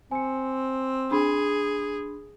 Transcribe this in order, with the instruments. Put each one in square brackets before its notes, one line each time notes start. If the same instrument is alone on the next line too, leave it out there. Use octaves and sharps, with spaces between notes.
[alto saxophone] C4 [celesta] G#5 C#7
[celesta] D4 B5 C6 [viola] G#4